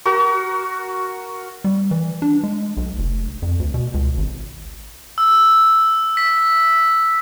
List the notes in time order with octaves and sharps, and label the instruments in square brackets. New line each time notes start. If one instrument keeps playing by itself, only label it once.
[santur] F#4 A#4
[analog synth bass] G3
E3
D4
G#3
B1
F1
F2
D2
B2
C#2
G#1
[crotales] E6
B6